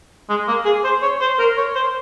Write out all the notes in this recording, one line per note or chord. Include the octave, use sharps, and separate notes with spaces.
G#3
A#3
G#4
C5
C#5
C5
A#4
C#5
C5